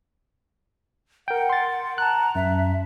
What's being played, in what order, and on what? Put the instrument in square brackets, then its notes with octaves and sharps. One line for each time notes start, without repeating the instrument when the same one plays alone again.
[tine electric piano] A#4 G5 [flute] F#5
[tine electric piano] C6 A6
[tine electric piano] A5 F#6 [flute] A#5
[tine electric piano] F#2 [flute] E5